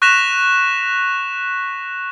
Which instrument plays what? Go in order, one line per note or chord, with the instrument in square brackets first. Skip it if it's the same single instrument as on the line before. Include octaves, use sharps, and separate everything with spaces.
[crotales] C#6 F#6 A#6 B6 E7 F7